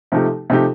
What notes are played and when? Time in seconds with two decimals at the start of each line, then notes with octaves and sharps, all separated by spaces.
0.12 C3 F3 A3 D#4 G4
0.50 C3 F3 A3 D#4 G4